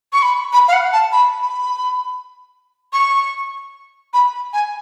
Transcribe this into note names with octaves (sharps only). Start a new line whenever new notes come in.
C#6
B5
B5
F5
F#5
A5
B5
B5
C#6
B5
G#5